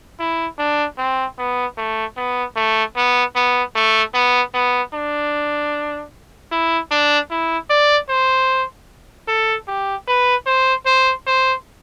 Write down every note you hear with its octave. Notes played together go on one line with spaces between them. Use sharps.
E4
D4
C4
B3
A3
B3
A3
B3
B3
A3
B3
B3
D4
E4
D4
E4
D5
C5
A4
G4
B4
C5
C5
C5